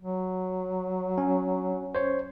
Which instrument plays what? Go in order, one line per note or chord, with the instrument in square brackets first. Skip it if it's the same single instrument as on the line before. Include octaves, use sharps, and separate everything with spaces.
[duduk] F#3
[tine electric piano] C#4
C5 C#5